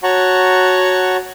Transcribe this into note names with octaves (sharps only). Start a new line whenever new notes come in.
F#4 C#5 F#5 A5 A#5 C#6